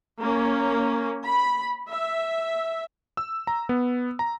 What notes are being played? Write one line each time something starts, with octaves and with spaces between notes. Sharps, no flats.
A#3 C#4
B5
E5
E6
A#5
B3
A#5